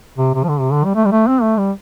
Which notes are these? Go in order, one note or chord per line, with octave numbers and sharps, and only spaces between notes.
C3
C3
F3
D3
C3
D3
G3
A3
G3
A3
C4
A3
G3